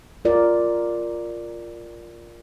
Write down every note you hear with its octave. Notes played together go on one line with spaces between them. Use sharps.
F4 A#4 D5